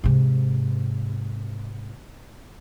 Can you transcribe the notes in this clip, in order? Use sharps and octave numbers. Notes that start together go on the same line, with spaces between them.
G#2 C3